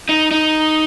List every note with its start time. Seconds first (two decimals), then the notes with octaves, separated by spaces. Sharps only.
0.09 D#4
0.31 D#4